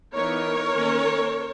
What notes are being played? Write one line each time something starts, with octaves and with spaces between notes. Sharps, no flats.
E3 B3 D#4 A#4 C#5
D#3 A#3 C#4